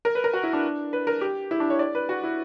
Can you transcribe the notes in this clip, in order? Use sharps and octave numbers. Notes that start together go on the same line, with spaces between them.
A#4
B4
A#4
F#4
E4
D4
B4
A#4
G4
E4
D4
C#5
D5
B4
F#4
E4